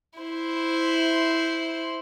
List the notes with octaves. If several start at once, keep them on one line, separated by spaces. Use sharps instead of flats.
E4 C5